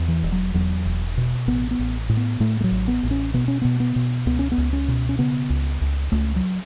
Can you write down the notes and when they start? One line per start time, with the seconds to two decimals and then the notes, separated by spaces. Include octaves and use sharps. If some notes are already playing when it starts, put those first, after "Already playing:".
Already playing: E2
0.08 E3
0.24 E1
0.32 F#3
0.54 E2 F#3
0.85 E1
1.17 B2
1.47 A1 B3
1.71 B3
1.79 A1
2.09 A2
2.17 B3
2.40 A2 A3
2.60 A3
2.64 F#3
2.71 A1
2.88 B3
3.03 A1
3.11 C#4
3.34 B2 B3
3.48 C#4
3.62 B2 B3
3.80 B3
3.96 B2
4.26 C#2 B3
4.39 C#4
4.52 B3
4.58 C#2
4.73 C#4
4.88 B2
5.09 C#4
5.19 C#3 B3
5.50 C#2
5.81 C#2
6.12 C#2 A3
6.36 F#3